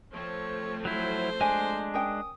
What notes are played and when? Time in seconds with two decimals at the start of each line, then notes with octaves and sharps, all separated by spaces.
0.13 F3 A3 C4 C#5
0.85 F#3 E4 C5
1.41 G#3 D4 G#5
1.94 C#4 A#4 G5 D#6